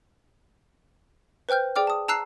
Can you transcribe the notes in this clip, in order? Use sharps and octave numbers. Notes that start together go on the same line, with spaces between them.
B4 C5 G5 F6 G6
G#4 D5 G5 D6 F6
A5 D#6
A5 A#5 E6 F#6 C7 F7